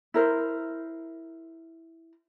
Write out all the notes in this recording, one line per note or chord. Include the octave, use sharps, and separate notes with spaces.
E4 A#4 C5